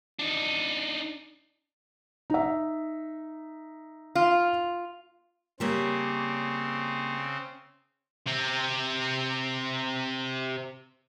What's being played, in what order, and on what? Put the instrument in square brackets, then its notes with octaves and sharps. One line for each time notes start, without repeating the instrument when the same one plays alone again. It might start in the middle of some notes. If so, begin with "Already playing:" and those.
[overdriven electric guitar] D4 D#4
[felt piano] D#4 E5
[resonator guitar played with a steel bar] F4
[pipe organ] C#3 C4 [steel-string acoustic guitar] G3 A#3 C#5
[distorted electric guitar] C3 C4